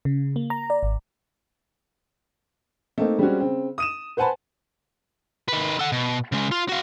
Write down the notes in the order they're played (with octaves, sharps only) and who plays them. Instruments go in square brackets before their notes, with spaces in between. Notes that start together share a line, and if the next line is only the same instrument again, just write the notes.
[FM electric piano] C#3
A#3
A#5
D5
G#1
[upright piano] A3 A#3 C4 D#4
G3 G#3 C4 C#4 F#4
C#3 C4
D#6 D#7 E7
B4 C5 F#5 G#5 A5 B5
[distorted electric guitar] D#3 B4
A4 F#5
B2
C#3 G#3
F4
F#4 F5